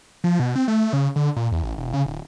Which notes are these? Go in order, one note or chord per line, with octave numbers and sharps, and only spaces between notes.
F3
B2
C4
A3
C#3
D3
A#2
E2
A1
E1
C#3
D1